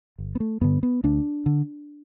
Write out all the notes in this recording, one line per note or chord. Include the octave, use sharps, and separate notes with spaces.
G1
B3
A3
G2 D3 B3
B3
D2 D4
D3